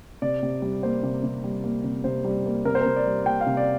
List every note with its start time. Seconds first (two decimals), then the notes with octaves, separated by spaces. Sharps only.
0.22 C3 D5
0.43 C3
0.62 G3
0.83 A#3 C5
1.03 C3
1.24 C3
1.44 G3
1.64 A#3
1.84 C3
2.04 C3 C5
2.24 G3
2.46 A#3
2.65 C3 A#4
2.75 C5
2.81 C3 A#4
2.96 D5
3.07 G3
3.26 A#3 G5
3.41 F5
3.47 C3
3.57 D5